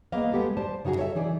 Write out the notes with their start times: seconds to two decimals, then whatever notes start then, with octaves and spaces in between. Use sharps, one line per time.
0.12 A#3 B3 G#4 D#5 F5
0.32 G#3 B3 G4 A4
0.57 C5 D5 A5
0.85 C#3 D#4 F4 F#4 G#4
0.96 A4 C#5 E5
1.15 E3 D#4 G#4 D5